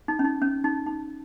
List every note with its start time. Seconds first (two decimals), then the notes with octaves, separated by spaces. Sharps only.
0.08 D#4
0.19 C#4
0.24 D#4
0.42 C#4
0.64 D#4
0.86 D#4